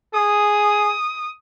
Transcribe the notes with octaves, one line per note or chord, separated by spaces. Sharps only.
G#4 D#6